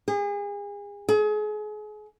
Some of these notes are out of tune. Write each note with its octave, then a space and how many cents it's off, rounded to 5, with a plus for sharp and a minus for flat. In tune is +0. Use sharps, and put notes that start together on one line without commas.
G#4 -35
G#4 +35